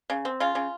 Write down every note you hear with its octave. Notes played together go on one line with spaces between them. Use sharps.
C#3
C4
C#3 F4
C#3